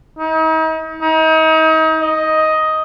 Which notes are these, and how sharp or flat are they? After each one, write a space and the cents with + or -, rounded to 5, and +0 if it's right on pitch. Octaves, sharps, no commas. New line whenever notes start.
D#4 +40
D#4 +35
D#5 +10